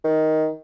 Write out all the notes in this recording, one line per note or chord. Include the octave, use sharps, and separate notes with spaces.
D#3